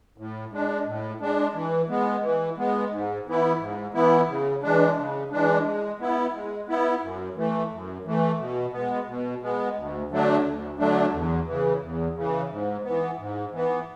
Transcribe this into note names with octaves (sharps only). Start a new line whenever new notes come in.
A2
G#3 D4
A2
G#3 D4
E3
G#3 B3
E3
G#3 B3
G#2
E3 B3 E4
G#2
E3 B3 E4
C#3
E3 G#3 D4
C#3
E3 G#3 D4
G#3
B3 E4
G#3
B3 E4
F#2
E3 A3
F#2
E3 A3
B2
G#3 B3
B2
G#3 B3
D2
D3 F#3 A3 D4
D2
D3 F#3 A3 D4
E2
C#3 E3
E2
C#3 E3
G#2
E3 B3
G#2
E3 B3